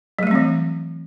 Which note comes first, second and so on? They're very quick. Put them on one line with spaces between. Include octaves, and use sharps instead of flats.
F#3 A3 G3 C4 E3